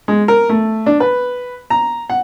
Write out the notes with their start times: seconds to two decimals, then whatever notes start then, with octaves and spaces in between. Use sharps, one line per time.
0.08 G#3
0.28 A#4
0.49 A3
0.86 D4
1.00 B4
1.70 A#5
2.10 F#5